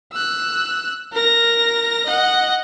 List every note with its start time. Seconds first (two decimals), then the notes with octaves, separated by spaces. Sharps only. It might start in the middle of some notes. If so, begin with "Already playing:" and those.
0.12 E6 F#6
1.12 A#4 A#6
2.06 D#5 F#5